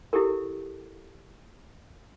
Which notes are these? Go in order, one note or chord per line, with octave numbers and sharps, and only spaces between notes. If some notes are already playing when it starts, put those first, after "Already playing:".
E4 G4 A4 A#4